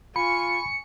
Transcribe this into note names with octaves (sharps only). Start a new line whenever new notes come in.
F4 G#5 B5 C#6 C#7